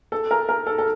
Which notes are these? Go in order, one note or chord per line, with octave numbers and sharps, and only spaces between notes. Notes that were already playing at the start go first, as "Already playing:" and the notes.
A4
A#4
A#4
A4
A4